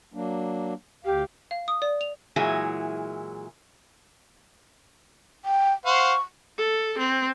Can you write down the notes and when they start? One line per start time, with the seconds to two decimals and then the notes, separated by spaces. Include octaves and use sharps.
0.14 F#3 A#3 D4
1.04 D2 G4 F5
1.51 F5
1.68 D#6
1.82 D5
2.01 F7
2.36 A#2 E3 F#3 G#3 E4 G#4
5.45 G5
5.86 C5 F5 F#5 C#6
6.58 A4
6.98 C4